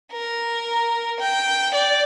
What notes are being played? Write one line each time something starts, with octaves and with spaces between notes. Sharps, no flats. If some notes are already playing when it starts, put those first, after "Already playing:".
A#4
G5
D5